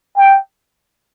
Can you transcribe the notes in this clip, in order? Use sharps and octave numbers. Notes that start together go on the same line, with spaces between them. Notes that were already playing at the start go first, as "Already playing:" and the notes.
G5